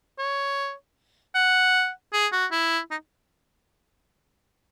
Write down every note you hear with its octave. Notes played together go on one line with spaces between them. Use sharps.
C#5
F#5
G#4
F#4
E4
D#4